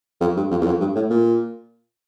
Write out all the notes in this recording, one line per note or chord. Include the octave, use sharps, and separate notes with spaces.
F2
G2
F2
E2
F2
G2
A2
A#2